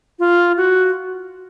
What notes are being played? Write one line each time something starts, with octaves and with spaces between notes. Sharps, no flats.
F4
F#4